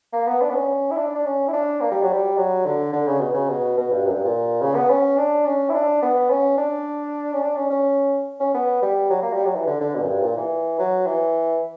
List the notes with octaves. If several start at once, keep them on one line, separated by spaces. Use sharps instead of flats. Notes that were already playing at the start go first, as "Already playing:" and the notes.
A#3
B3
D4
B3
C#4
E4
D4
D4
C#4
E4
D4
A#3
G3
F#3
G3
F#3
D3
D3
C#3
B2
C#3
B2
B2
G2
F#2
G2
A#2
C#3
B3
C#4
D4
C#4
E4
D4
B3
C#4
D4
C#4
D4
C#4
C#4
C#4
B3
G3
F#3
A#3
G3
F#3
E3
D3
D3
B2
F#2
G2
A#2
E3
F#3
E3